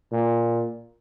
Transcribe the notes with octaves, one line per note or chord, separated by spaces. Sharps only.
A#2